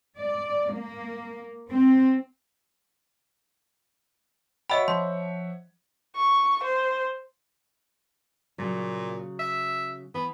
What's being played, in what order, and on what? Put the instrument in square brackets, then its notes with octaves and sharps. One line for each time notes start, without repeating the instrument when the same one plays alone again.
[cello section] D5
A#3
C4
[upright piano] C#5 E5 F#5 [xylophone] D#5 B5 [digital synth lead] G5
[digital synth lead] F3 [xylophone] C6
[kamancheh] C#6
C5
[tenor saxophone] A#2 [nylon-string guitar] C#3 F#3
[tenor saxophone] E5
[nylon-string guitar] E3 [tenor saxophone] B3